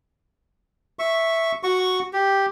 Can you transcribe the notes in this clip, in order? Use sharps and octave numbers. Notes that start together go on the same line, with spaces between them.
E5 C#6
F#4 C#6
G4